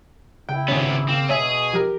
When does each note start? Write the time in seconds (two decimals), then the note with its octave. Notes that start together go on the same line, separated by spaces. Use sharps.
0.49 C#3 E4 G5
0.68 G#1 C3 B3 C#4
1.09 A#3 C4
1.29 B2 G#4 C#5 E5 G#5
1.73 F3 G4 A#4